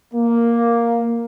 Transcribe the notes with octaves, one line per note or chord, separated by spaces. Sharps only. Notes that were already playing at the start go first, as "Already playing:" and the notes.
A#3